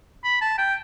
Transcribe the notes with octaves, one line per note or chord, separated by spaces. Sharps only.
B5
A5
G5